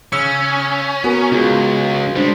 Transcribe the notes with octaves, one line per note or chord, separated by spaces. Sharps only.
C#3 C#4 E6 C#7
B3 F#4 A#4
C#2 F4 G#4
G3 G#3 D4 C5